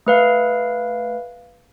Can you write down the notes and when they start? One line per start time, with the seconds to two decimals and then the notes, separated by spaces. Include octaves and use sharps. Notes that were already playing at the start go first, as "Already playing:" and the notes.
0.06 A3 B4 F5